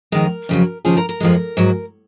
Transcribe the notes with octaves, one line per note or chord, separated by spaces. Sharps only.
F2 D#3 G#3 A#4
F2 C#3 F#3
D#2 C#3 F3 G#4
A#4
A#4
F2 F3 G#3
G#2 F#3